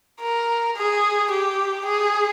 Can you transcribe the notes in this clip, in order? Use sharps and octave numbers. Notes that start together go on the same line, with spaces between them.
A#4
G#4
G4
G#4